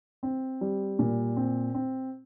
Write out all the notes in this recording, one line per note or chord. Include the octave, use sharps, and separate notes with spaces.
C4
G3
A#2
C4
C4